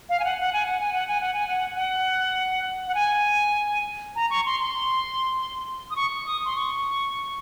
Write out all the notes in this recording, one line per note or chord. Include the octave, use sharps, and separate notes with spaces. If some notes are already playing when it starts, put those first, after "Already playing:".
F5
G#5
F#5
F#5
G#5
F#5
G#5
F#5
G#5
F#5
G#5
F#5
F#5
F#5
G#5
A#5
C#6
C6
C6
D#6
C#6
C#6
D#6
C6
C#6